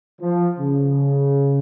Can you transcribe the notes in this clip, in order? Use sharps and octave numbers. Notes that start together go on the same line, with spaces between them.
F3
C#3